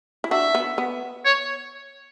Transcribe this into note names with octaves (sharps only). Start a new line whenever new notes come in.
E4
D4 F#4 E5
B3
B3
C#5